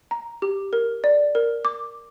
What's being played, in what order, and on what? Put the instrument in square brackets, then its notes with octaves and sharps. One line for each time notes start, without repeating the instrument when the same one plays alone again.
[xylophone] A#5
G4
A#4
D5
A#4
D6